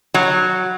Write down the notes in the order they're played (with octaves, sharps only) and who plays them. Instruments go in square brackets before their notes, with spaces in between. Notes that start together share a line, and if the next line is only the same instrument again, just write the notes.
[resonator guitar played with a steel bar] F#3